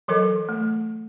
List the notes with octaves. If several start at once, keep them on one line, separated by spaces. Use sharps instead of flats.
E3 F#3 A4 A#4 D#5
A3